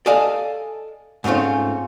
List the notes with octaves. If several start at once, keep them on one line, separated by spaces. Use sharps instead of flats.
A4 D5 D#5 F5 G#5 A5
G#2 A3 C4 C#4 F4